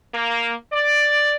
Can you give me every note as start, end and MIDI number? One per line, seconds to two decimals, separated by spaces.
0.14 0.53 58
0.73 1.36 74